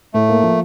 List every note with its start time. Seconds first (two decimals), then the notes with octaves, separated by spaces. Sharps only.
0.14 A2 A3
0.29 A#3
0.43 F3